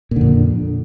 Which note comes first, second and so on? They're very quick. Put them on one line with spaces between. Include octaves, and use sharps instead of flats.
A#2 D3 F2